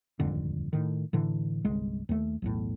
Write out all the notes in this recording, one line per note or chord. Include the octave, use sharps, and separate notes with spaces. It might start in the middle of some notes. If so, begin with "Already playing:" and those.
D#1 G#1 F2 D3
A2 D#3
A2 D3 E3
G1 C2 G#3
D#2 A3
B1 E2 A2